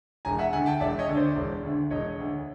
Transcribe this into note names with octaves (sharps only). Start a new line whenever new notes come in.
E1 G#5 A#5
E5 F#5
D2 D3 F#5 G#5
G5 A5
E1 D5 E5
C#5 D#5
D2 D3
C5 D5
E1
D2 D3
E1 C#5 D#5
D2 D3